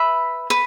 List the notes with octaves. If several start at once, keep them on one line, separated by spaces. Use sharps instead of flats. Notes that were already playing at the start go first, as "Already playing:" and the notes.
Already playing: B4 E5 B5
B4